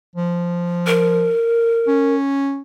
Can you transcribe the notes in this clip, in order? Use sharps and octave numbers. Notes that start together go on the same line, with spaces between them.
F3
A#4
C#4